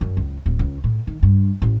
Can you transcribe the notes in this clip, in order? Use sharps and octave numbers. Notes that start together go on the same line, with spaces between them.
F#2
C#2
D1
C#2
A2
D#3
G2
A1